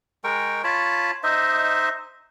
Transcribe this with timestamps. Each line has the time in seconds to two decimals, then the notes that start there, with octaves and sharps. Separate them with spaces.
0.24 G#3 A#4 G5 C#6
0.64 F4 C#5 A5 B5
1.23 D#4 C5 D#5 E5